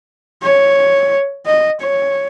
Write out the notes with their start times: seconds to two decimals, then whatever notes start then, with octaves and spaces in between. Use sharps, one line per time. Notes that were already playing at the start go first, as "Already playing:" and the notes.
0.43 C#5
1.47 D#5
1.80 C#5